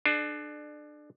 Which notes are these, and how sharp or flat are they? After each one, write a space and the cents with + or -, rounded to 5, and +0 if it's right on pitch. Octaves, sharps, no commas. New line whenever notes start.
D4 +25 A4 -40